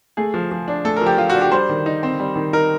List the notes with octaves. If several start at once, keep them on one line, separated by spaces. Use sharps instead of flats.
A3 G#4
F3
F3
D4
A3 A4
A#4
F3
G4
F3 F4
F#4
D4
G4
G3 C5
D#3
D#4
C4
G3
D#3
D#4 A#4